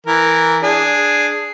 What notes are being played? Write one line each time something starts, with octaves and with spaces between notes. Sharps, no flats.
E3 A#4
D4 G#4